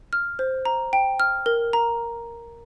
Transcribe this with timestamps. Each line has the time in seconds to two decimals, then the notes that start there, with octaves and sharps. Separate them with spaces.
0.13 F6
0.39 C5
0.65 A#5
0.93 G5
1.20 F6
1.46 A#4
1.73 A#5